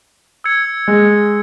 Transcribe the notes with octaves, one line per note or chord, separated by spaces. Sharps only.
E6 G#6 C#7
G#3